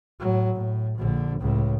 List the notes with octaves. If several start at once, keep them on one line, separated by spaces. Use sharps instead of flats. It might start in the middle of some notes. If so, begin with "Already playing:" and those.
A2 F#3
A2
A#1 D3
C#2 A2